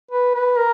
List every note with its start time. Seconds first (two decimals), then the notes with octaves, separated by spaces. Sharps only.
0.11 B4
0.35 B4
0.58 A#4